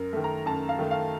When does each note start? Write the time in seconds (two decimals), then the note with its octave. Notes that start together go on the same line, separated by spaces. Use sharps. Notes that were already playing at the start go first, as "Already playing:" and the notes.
Already playing: F#2 A#4
0.13 D#3 A3
0.24 A#5
0.46 F#2 A5
0.69 F5
0.79 D#3 A3
0.91 F5